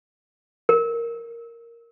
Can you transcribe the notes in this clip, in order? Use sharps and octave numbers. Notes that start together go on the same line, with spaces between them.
A#4